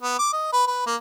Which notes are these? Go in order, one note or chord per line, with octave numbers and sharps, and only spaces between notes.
B3
D6
D#5
B4
B4
A#3